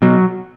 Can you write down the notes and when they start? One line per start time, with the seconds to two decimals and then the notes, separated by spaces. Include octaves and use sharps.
0.02 B2 F#3